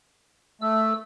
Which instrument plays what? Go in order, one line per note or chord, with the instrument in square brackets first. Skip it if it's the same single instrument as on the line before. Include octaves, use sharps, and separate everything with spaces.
[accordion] A3 [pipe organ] E6